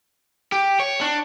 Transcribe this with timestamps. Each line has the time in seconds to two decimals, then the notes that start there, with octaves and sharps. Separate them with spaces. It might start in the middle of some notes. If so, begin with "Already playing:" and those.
0.52 G4
0.80 C#5
1.01 D4